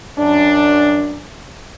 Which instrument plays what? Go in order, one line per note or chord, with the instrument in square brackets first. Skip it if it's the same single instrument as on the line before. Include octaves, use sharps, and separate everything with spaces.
[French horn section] F#2 D4